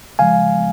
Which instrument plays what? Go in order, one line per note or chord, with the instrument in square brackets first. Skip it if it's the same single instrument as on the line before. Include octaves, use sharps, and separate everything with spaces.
[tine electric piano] C#3 F3 G#3 F5 G#5